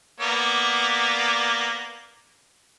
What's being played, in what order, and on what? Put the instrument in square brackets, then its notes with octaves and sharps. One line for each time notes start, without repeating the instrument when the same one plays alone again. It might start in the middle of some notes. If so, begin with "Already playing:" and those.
[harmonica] A#3 B3 D5